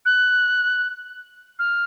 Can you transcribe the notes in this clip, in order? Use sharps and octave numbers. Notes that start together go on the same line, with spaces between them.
F#6
F6